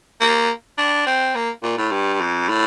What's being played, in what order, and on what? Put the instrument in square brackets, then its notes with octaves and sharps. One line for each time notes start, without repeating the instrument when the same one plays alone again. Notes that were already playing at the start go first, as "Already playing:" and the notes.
[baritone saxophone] A#3
D4
C4
A#3
A#2
A2
G2
F2
A2